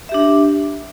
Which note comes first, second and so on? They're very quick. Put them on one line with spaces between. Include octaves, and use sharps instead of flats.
E5 G4 D4